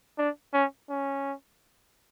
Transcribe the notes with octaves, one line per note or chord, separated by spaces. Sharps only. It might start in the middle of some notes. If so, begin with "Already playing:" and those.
D4
C#4
C#4